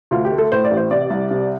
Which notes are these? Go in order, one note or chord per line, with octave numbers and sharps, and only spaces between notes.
D2 F4
G4
A3
A4
A2 C5
D5
A1
C5
C3 D5
C2
C3